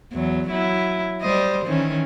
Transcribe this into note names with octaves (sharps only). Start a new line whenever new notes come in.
E2 F#3
F#3 E4
G3 C5 D#5
D#3 E3 C#4